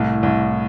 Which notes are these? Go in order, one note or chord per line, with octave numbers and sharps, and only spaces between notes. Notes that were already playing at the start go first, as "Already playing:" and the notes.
Already playing: C2 A2
C2